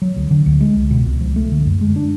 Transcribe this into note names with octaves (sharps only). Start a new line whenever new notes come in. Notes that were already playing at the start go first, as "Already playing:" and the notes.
F#3
D2
D3
D2
G#3
C#2
B2
C#2
F3
A3
D3
F#2
G#3
D4